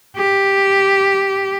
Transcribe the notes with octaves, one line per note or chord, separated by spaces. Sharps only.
G4